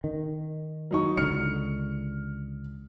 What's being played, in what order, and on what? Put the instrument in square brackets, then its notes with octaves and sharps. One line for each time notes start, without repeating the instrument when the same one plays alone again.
[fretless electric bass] D#3
[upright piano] F#3 D#4 C#6
[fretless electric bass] C#2 D3 [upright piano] F6 C#7